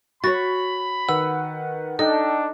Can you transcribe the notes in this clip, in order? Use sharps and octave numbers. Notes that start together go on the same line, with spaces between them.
F#4 C#5 B5 A6
D#3 B4 F#5 E6
D4 D#4 A4 D#5 G5